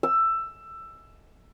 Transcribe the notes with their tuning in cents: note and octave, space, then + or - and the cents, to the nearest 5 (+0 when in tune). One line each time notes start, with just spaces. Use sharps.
E6 +15